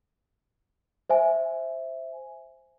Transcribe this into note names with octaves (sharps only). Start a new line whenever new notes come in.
C5 E5 G#5